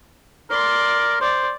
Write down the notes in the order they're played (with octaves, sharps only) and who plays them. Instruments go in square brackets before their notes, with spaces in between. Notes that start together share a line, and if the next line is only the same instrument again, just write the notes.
[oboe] A#4 [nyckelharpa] D5 C6
[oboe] C5 [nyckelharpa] D5